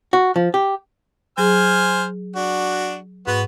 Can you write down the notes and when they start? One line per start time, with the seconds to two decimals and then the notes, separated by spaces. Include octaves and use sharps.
0.13 F#4
0.36 F3
0.54 G4
1.38 F#3 G#4 C5 G#5 F6
2.36 D4 F#4
3.27 G#2 B3 F#4 B4